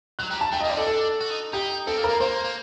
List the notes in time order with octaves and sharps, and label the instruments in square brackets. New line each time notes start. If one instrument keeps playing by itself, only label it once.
[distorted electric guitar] F#3 [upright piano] F#6
[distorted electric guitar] G3 [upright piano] A#5
[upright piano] A5
[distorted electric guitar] A3 [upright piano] G5
[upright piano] D#5
[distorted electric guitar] A#3
[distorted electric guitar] C4 [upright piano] D5
[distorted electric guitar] D4 [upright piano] A4
[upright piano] A4
[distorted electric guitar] F#4
D#4
[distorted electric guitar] D#4 [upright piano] G4
[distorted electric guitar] C4 [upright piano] A4
[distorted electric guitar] A#3
[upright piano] A#4
[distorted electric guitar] A#3
[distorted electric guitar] A#3 [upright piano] C5
[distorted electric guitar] A#3